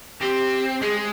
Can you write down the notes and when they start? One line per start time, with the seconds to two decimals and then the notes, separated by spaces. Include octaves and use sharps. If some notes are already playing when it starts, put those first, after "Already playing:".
0.21 C4 G4
0.81 G#3 G#4